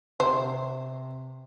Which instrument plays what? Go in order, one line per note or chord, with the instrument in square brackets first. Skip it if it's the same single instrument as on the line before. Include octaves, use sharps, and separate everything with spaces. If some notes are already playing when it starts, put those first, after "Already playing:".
[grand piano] C3 [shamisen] C5